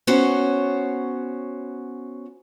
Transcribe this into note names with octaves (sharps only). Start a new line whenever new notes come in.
B3 C#4 F#4 C5 C#5